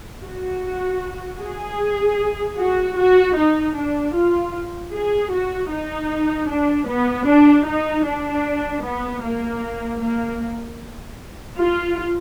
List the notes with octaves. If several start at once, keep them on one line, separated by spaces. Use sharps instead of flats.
F#4
G#4
F#4
F#4
D#4
D4
F4
G#4
F#4
D#4
D4
B3
D4
D#4
D4
B3
A#3
A#3
F4